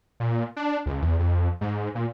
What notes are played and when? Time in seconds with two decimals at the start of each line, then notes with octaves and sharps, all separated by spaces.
0.20 A#2
0.56 D4
0.86 C#2
1.02 E2
1.19 F2
1.61 G#2
1.95 A#2